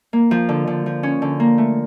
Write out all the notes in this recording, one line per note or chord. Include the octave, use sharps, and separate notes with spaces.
A#3
F3
D3
D3
F3
C#4
D3
A#3
A3